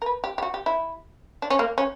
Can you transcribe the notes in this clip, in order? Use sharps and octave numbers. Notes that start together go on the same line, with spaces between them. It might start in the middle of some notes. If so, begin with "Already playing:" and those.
A#4
B4
G4
G4
F#4
G4
E4
D4
C#4
A#3
C#4